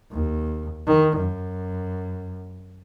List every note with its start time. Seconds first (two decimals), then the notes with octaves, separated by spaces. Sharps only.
0.11 D#2
0.87 D#3
1.16 F#2